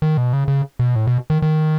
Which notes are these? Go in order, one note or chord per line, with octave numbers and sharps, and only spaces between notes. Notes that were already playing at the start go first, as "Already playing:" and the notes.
D#3
B2
C#3
C#3
B2
A2
B2
D#3
D#3